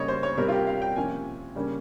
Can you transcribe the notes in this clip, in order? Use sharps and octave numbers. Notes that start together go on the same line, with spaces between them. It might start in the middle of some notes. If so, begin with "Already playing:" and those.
Already playing: C#3 G3 A#3 C#5 D#5
C5
C#5
C3 G3 C4 A#4
F4
G4
F5
G5
C3 F3 A#3 C#4 G#5
C#3 G3 A#3 C#4